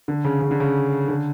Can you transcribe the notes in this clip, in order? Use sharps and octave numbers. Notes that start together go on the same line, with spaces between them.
D3
C#3
C#3
D3
C#3
D3